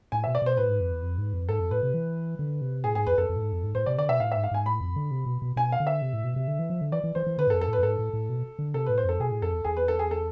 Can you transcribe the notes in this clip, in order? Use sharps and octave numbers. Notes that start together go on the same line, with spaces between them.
A2 G#5
B2 E5
D5
B2 C5
A2 B4
G#2
F2
E2
F2
G#2
F2
G#2 A4
F2
A2 B4
C3
E3
D3
C3
A2 G#4
G#2 G#4
F2 B4
F2 A4
F2
A2
G#2
F2
G#2
A2 C5
C3 D5
D3 D5
B2 E5
A2 F5
G#2 E5
F5
G#2 G#5
A2 B5
F2
D3
C3
B2
B2
B2 G#5
F5
D3
E5
C3
A2
B2
C3
D3
E3
F3
D3
E3 D5
E3
E3 C5
E3
D3 B4
G#2
A4
F2
A4
A2 B4
F2
G#2 A4
A2
A2
B2
D3
C3 A4
A2 B4
C5
F2 A4
B2 G#4
A2
F2 A4
E2
E2 G#4
B4
A4
G#4
A4